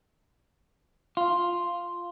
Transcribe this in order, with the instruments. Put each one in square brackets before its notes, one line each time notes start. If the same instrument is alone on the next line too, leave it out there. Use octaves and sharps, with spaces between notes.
[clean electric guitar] F4